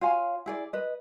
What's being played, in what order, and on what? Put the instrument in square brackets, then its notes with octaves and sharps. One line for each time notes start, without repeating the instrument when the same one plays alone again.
[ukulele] F4 C#5 F5 G#5
E4 G#4 D5
B4 D#5